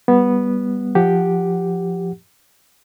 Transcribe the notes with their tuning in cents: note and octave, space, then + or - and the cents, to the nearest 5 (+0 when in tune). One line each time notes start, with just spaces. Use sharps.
G3 +0 B3 -10
F3 +0 G4 +0 F#5 +0